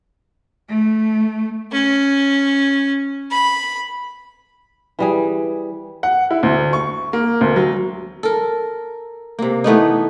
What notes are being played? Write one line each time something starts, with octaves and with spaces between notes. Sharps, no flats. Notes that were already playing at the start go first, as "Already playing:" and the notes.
A3
C#4
B5
E3 G3 G#4
F#5
E4
D2
C#6
A#3
D2
F#3
A4 A#4
C3 A#3
E3 A3 B3 D#4